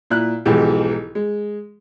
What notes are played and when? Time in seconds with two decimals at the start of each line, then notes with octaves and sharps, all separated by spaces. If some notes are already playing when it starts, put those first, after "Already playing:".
0.10 A#2 E4 F#6
0.45 B1 G#2 E3 F3 G#3 G4
1.15 G#3